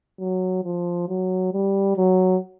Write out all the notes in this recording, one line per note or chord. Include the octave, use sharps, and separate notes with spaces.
F#3
F3
F#3
G3
F#3